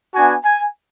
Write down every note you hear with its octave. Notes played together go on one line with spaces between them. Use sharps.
B3 D4 F#4 G#5
G#5